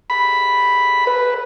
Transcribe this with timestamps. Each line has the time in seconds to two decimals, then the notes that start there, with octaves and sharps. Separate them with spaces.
0.10 B5
1.07 B4